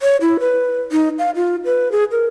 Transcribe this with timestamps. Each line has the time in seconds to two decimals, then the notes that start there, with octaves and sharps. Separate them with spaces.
0.02 C#5
0.21 E4
0.40 B4
0.92 D#4
1.19 F5
1.36 F4
1.65 B4
1.92 G#4
2.11 A#4